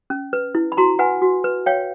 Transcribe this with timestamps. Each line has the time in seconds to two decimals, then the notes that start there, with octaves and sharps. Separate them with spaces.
0.10 C#4
0.33 B4
0.55 E4
0.72 B5
0.77 F#4 A#5 C6
0.99 B4 F#5 G#5
1.22 F#4
1.44 B4
1.66 C#5 F5 G5